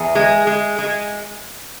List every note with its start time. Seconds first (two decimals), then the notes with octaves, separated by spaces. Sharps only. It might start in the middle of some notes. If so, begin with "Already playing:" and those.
Already playing: E2 G#4
0.15 G#3
0.47 G#3
0.78 G#3